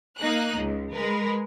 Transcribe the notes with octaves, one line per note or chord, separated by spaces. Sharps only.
A#3 D#4 F#6
C#2
G#3 A#4 B4